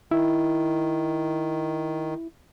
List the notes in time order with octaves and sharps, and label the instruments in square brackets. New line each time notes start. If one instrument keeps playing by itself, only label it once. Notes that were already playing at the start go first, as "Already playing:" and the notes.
[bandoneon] D#3 [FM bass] E4